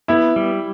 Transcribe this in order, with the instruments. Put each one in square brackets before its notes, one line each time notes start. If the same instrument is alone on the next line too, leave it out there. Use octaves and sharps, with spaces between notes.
[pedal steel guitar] B3 [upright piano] E4 E5
[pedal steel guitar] G3